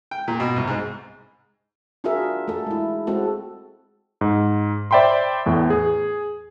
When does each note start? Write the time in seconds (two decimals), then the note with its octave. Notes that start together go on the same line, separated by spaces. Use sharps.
0.11 G5
0.28 A#2
0.40 B2
0.56 C2
0.68 G#2
2.04 D4 F4 F#4 G#4 A#4 E5
2.48 A3 A4
2.66 G#3 E4
3.07 G#3 C4 F#4 A4
4.21 G#2
4.91 C5 D5 E5 G5 B5 C6
5.46 E2 A2
5.70 G#4